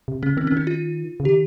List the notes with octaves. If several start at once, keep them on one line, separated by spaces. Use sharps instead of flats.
C3
C#3 C#4
D#3 C4
C#4
D#3 D#4
F4
C#3
D#3 G4